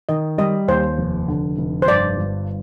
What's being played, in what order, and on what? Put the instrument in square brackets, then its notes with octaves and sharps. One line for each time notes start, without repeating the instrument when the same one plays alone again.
[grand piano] D#3 [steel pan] D#5
[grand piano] G3 [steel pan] D#5
[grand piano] D#2 [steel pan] C5
[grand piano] F1
D3
F1
[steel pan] C5
[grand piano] G2 [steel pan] D5
[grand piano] G1